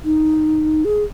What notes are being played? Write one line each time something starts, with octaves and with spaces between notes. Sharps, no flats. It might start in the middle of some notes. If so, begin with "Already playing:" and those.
D#4
G#4